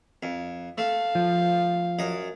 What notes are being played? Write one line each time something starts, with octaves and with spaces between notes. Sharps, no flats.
F2
A3 F5
F3
F#2 D#5